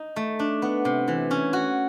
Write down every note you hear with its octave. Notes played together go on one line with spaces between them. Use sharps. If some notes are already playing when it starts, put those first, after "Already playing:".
Already playing: D#4
A3
D4
B3
C3
E3
C#4
F#4